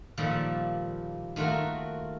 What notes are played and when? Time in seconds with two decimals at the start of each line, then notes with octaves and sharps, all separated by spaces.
0.17 A#2 D#3 F3 G3 A4
1.36 D#3 A3 F4 F#4 A#4